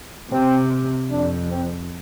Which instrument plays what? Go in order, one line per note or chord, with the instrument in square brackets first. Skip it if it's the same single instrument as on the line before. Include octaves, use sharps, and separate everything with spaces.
[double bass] C3 [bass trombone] C4
[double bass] F2 [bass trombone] D4
[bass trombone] C4